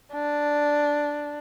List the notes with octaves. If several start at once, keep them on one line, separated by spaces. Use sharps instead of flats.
D4